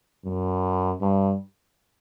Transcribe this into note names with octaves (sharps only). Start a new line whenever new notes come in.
F#2
G2